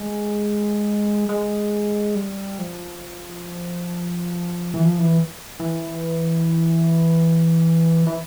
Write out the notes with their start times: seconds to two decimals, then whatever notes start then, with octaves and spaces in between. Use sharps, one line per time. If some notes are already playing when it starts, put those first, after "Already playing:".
Already playing: G#3
1.29 G#3
2.15 G3
2.59 F3
4.74 E3
4.85 F3
4.98 E3
5.60 E3
8.07 E3